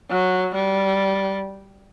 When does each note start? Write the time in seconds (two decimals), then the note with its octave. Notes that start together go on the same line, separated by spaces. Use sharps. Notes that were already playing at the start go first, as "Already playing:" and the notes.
0.10 F#3
0.55 G3